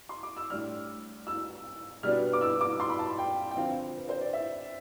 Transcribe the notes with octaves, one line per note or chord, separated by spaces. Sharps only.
C6
D6
E6
A2 G3 D4 F6
E6
B2 G3 B3 D4 F6
D6
E6
D6
C6
B5
A5
G5
G5
D3 F3 C4 F5
B4
C5
D5
E5